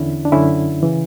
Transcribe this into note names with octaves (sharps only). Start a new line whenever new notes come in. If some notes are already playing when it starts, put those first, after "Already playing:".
Already playing: E2 D3 C#4 E4
D4
F#2 D3 C#4 E4
C#3 E3